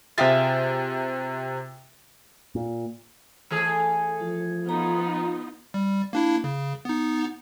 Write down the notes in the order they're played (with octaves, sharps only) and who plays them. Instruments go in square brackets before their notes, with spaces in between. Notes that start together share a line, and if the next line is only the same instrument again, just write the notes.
[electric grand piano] C3 G5 A6 [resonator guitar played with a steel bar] F4 G#4 E5
[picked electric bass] A#2
[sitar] E3 A3 G#4
[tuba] F3
[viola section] B3 D#4 F4 [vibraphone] A#5
[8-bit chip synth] G3
A#3 D4 E4
C#3
B3 D#4